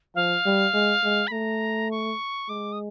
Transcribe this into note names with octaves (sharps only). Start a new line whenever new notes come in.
F3 F5
G3
G#3
G#3
B5
A3 A#5
C#6
G#3 D6
D#6